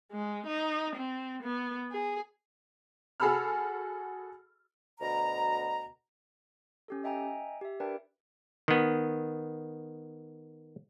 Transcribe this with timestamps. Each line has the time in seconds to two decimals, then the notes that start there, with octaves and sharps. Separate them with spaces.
0.12 G#3
0.46 D#4
0.96 C4
1.43 B3
1.91 G#4
3.20 F#4 G#4 A4 B5 E6 F6
5.01 D2 B2 A#5
6.88 C#4 G4 A4
7.04 D#5 E5 G5 G#5 A#5
7.61 G4 E5
7.80 D4 A#4 B4 D5 G5 A5
8.68 D#3 B3